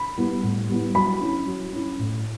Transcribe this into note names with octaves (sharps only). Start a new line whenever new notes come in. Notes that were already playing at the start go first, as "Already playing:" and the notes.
Already playing: B5
G3 B3 E4
A2
G3 B3 E4
F#3 B5
C#4 E4
F#3
C#4 E4
A2